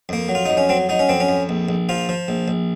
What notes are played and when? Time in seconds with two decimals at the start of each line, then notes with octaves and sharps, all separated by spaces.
0.09 F2 A#3
0.29 F#3
0.35 F4
0.46 F2 D#4
0.57 C#4
0.69 F#3 C4
0.89 F#3 D#4
0.99 C#4
1.09 F2 C4
1.20 C#4
1.29 F2
1.49 A#1
1.69 A#1
1.89 F3 F4
2.09 F3
2.28 A#1
2.48 A#1